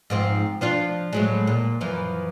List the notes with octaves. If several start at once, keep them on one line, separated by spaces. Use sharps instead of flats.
G#2 F3 C4
F3 D4 F4
A2 F#3 G#3
A#2
F#2 E3 F3